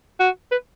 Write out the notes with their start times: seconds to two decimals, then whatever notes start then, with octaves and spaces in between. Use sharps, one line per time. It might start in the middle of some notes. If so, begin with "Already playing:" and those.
0.20 F#4
0.51 B4